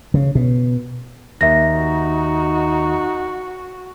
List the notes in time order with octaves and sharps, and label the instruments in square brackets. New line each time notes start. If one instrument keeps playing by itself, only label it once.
[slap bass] C#3
B2
[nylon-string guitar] D#2 [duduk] D#4 [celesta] E5 A#6
[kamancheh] F#4